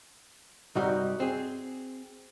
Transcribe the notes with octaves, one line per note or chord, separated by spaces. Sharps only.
C2 G2 G3 D#4 F#4
C4 G#4